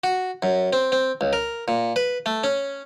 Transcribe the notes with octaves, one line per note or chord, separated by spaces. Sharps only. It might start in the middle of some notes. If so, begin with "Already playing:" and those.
F#4
F#2
C4
C4
C#2
A#4
A#2
B4
A3
C#4